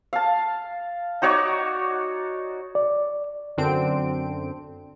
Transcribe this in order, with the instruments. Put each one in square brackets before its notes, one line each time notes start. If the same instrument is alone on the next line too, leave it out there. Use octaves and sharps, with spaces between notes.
[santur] F5 A5
D#4 F#4 C#5 D5
[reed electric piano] D5
[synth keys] F#2 D3 C4 D4 D7